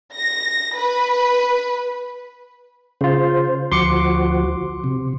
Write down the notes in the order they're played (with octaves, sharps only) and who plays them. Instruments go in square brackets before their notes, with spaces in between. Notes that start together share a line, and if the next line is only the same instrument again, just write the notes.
[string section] A#6
B4
[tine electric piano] C#3 F4 [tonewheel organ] C5
[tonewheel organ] D2 F3 F#4 [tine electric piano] C6 D6 C#7
[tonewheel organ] C3